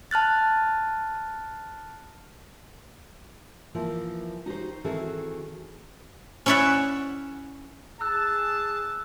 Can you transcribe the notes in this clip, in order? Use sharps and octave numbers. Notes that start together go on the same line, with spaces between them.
A5 F6 F#6 A6
E3 F3 A#3
D#4 F#4 G4 C5
D#3 E3 C4 F#4 G#4 A4
C#4 E4 C#5 D5 E5 F#5
G#4 A5 E6 F#6